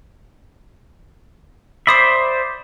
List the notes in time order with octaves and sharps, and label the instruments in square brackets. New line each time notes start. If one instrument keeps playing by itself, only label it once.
[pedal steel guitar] C5 D5 E5 [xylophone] B5 D#6 C7